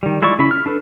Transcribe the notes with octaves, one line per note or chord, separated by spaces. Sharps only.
D#3 G3
G#3 E4 F4 D5 C#6
C#3 C#4 E4 B5
F6
D4 A4 B4